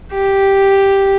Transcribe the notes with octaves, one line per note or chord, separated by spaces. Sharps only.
G4